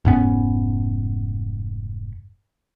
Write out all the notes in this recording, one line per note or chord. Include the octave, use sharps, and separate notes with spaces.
F1 G#2 B3 C#4